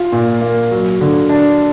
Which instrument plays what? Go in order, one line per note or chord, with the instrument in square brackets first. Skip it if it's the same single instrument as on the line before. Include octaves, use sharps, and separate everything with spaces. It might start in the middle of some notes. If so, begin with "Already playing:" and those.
Already playing: [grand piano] F4
A#2
A#3
F#3
D3
D4